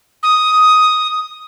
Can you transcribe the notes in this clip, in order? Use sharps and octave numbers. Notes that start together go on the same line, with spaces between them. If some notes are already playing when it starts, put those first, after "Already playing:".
D#6